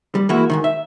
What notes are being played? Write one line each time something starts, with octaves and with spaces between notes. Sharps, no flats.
G3
E3 G#3 A#3 E4 F#4
G#2 C3 D#3
E5